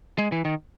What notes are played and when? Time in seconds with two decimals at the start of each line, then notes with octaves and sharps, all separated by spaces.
0.18 G#3
0.32 E3
0.45 D#3